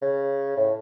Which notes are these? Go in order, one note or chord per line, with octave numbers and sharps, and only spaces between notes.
C#3
A2